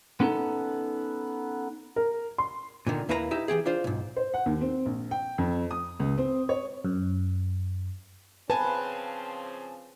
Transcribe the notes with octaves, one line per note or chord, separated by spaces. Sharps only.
B3 C#4 D#4 A4
A#4
C6
A#2 D3 D#3
D#2 A#3 E4 B4 C5 A#5
D#4 E4 G4 E5
E3 F#3 G4 G#4
D4 F4 C5
B1 G#2
C5
F#5
D#2
C4
A#1
G5
F2
D#6
C#2
C4
C#5
F#2
C#3 F3 C4 B4 G#5 A5